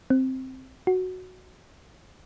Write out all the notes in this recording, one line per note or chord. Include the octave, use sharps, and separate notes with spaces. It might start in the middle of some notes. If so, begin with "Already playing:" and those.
C4
F#4